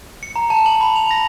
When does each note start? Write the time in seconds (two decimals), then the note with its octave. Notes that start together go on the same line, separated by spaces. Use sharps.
0.23 C#7
0.36 A#5
0.50 A5
0.66 F#7
0.81 B5
0.96 F7
1.11 A#6